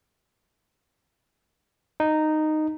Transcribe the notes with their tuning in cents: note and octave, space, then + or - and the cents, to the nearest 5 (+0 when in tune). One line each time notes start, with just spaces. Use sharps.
D#4 -10